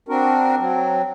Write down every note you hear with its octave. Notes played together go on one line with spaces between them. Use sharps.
C4 D4 F#4 A#4
F#3 C4